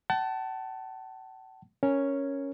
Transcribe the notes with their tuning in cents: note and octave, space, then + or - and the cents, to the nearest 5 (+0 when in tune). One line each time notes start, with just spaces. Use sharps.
F#5 +45 A5 +0
C#4 +0 A#4 +0 C#5 +0